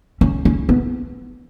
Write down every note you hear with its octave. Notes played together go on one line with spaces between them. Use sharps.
C#4
C#4
B3